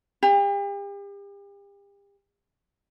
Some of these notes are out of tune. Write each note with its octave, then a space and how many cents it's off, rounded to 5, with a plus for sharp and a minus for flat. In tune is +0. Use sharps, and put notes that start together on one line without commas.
G4 +40